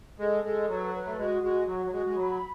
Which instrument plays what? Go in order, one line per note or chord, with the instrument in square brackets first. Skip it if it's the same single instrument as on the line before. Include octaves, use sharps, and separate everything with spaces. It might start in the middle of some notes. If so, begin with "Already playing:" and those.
[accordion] G#3 [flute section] A4
[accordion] G#3 [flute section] A4
[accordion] F#3 [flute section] B4
[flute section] B4
[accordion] A3
[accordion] G#3 [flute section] F#4
[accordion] G#3 [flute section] F#4
[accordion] F#3 [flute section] F#4
[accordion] F#3
[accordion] G#3 [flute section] F#4
[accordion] G#3
[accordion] F#3 [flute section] B5